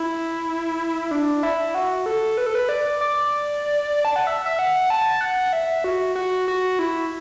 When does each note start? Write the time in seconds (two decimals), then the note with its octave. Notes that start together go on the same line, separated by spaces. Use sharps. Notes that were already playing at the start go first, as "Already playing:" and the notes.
Already playing: E4
1.11 D4
1.43 E4
1.75 F#4
2.06 A4
2.38 B4
2.46 A4
2.55 B4
2.69 D5
3.01 D5
4.05 A5
4.16 F#5
4.27 E5
4.46 E5
4.59 F#5
4.90 A5
5.21 F#5
5.53 E5
5.84 F#4
6.15 F#4
6.48 F#4
6.79 E4